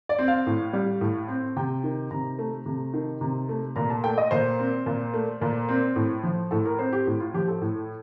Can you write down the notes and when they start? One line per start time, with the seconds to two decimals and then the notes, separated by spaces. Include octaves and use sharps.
0.09 D5
0.19 C4
0.28 F5
0.46 A2
0.73 G3
1.01 A2
1.28 C4
1.56 C3 G5
1.84 D#3
2.11 C3 A#5
2.39 A3
2.66 C3
2.94 D#3
3.21 C3
3.49 A3
3.76 A#2 A#5
3.90 A5
4.04 A3 G5
4.18 D#5
4.31 A#2 C5
4.59 C4
4.86 A#2
5.14 A3
5.41 A#2
5.69 C4
5.96 A2
6.23 F3
6.51 A2 A4
6.66 A#4
6.79 C4 C5
6.93 G4
7.07 A2
7.20 F4
7.34 F3 G4
7.48 A4
7.62 A2